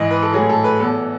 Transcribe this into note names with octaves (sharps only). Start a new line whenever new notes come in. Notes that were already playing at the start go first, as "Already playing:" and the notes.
Already playing: G#2 E3 D#5
B4
A4
A2 F#3 G#4
A4
B4
E2 B2 F#3 A4